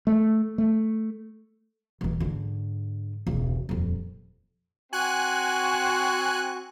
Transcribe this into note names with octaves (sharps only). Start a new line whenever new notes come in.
A3
A3
D#1 E3
G#2 D3
E1 C#2
D#1 F2
C4 F#4 G#5 F#6